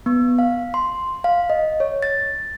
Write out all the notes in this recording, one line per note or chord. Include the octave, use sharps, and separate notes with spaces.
B3
F5
C6
F5
D#5
C#5
A6